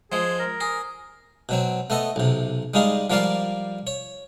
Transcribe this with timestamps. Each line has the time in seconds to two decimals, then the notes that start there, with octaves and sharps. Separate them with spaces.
0.12 F3 G#3 G#4
0.39 A#4
0.61 G#4
1.49 B2 F#3 C4
1.90 A3 B3 A4 D#5
2.16 B1 C3
2.74 G3 G#3 D#4 F4 G#4
3.10 F3 G3 A#3 F4 D5 F5
3.87 C#5